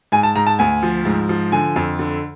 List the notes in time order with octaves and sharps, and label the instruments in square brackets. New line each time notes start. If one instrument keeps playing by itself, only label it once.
[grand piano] G#2 G#5
A5
G#2 A#5
A5
D2 G#5
F3
G#2
F3
D3 G#5
F2
D3